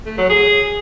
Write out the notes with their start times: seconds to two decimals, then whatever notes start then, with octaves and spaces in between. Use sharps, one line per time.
0.06 A3
0.18 F#3
0.30 G#4